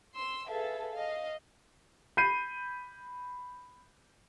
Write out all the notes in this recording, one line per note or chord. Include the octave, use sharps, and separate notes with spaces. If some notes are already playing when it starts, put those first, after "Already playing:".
C6 E6
G#4 A4 B4 E5 F5
D#5 F5
B5 G6 C7 D#7